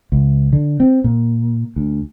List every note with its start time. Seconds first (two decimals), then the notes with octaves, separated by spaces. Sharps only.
0.12 C#2
0.53 D3
0.80 C4
1.04 A#2
1.76 D2